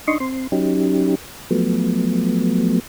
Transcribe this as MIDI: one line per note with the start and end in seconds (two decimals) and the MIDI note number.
0.08 0.18 62
0.08 0.18 63
0.08 0.18 75
0.08 0.18 84
0.08 0.18 85
0.20 0.47 60
0.20 0.47 84
0.52 1.15 54
0.52 1.15 61
0.52 1.15 63
0.52 1.15 67
1.51 2.80 53
1.51 2.80 54
1.51 2.80 57
1.51 2.80 59